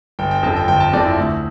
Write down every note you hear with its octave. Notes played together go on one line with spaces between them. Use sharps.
G1 G5
G5
F2 D3 A5
G5
G1 G5
A5
F2 D3 D5
E4
D2